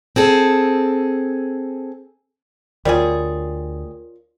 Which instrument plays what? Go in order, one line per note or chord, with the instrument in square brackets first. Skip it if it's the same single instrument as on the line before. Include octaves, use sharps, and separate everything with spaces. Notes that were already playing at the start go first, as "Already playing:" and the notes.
[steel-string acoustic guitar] C4 G#4 A4
[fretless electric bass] D2 [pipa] G3 G#4 [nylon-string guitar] F4 C#5 D5 [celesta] A#4